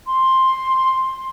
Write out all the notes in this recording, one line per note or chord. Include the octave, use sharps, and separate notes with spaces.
C6